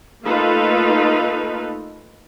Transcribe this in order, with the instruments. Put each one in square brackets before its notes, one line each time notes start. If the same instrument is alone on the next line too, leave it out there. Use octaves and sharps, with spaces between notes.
[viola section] A3 A#3 D#4 F4 A4 B4